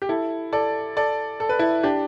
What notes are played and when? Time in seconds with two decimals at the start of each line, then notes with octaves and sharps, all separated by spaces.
0.02 G4
0.09 E4 A4
0.53 A4 D5
0.97 A4 D5
1.40 A4
1.49 B4
1.59 E4 A4
1.83 D4 G4